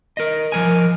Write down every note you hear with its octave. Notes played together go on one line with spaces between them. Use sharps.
A#4 D#5
F3 A#4 G#5